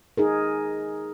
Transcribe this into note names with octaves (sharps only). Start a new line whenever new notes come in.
D#4 G#4 A#4